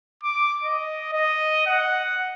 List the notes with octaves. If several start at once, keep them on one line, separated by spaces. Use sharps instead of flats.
D6
D#5
D#5
F#5